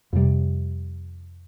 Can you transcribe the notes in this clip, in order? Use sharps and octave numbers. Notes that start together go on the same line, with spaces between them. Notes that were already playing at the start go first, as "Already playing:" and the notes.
F2 C3 G3